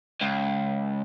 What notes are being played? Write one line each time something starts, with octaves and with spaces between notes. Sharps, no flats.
C#2